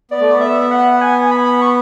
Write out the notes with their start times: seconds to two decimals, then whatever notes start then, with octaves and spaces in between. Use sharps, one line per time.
0.11 B3 D5
0.21 A3
0.30 B3
0.41 E5
0.61 E5
0.71 F#5
0.91 F#5
1.01 G#5
1.31 B5
1.62 C#6